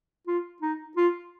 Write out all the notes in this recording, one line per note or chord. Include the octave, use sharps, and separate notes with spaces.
F4
D#4
F4